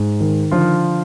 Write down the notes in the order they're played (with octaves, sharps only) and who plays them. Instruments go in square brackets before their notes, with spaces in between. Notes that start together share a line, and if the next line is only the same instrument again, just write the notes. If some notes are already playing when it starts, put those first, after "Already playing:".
Already playing: [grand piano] G#2
D#3
D3 F3 F4